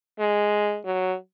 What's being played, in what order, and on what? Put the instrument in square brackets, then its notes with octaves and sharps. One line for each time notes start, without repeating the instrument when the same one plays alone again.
[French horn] G#3
F#3